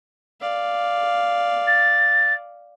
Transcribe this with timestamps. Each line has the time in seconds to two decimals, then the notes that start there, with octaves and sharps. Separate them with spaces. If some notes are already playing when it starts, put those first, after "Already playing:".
0.40 D5 F5
1.67 A6